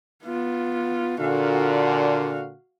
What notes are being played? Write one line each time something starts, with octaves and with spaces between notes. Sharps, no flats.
B3 F4
A#2 D3 F#4 F5